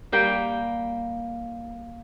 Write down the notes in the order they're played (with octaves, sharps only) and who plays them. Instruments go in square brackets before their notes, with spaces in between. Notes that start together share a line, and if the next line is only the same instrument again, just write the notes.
[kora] G3 A#3 G5